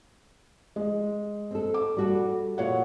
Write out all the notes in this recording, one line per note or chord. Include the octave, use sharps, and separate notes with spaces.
G#3
C4 A4
D6
G3 F#4 A4
A#2 C#5 F#5